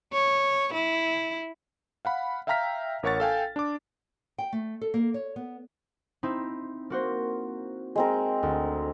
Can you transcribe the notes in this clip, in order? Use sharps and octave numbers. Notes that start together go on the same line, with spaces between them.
C#5
E4
F5 F#5 B5
E5 F5 G5 A#5 F6 B6
A1 A#4 C#5 F#5 C#6 A6
A4 F5 G5 G#5
D4 D6
G5
A3
A4
A#3
C#5
B3
C4 D#4 E4
A#3 F#4 C5
G#3 C4 A#4
D2